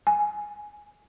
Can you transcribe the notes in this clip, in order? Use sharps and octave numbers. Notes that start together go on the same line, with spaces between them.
G#5